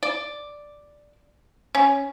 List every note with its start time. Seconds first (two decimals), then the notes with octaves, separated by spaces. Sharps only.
0.03 D5
1.75 C#4